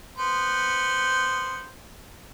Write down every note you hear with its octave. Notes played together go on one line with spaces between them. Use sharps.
B3 C5